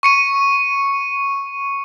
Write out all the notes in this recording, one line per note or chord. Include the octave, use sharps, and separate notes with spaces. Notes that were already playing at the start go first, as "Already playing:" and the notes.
C#6 C#7 D#7